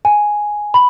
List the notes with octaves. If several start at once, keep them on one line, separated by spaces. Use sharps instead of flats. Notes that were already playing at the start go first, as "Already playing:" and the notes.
G#5
B5